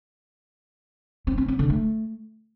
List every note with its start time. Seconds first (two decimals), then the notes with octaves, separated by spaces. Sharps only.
1.27 C4
1.38 C4
1.48 C4
1.59 D3
1.70 A3